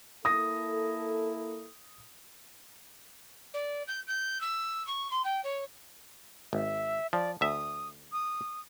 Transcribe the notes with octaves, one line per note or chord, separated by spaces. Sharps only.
A#3 E4 A4 D#6 A#6
D5
G6
G6
E6
C#6
C6
G5
C#5
G#1 E5
F3 D5
D2 E5 D#6
D#6